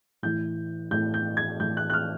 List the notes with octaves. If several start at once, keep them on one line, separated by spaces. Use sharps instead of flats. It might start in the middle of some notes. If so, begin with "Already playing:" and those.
A2 E3 G6
A2 E3 G6
G6
G#6
A2 E3 G6
F#6
F#6
F6